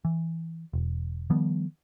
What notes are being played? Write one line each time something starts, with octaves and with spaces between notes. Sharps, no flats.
E3
E1
D#3 F3 G3 B3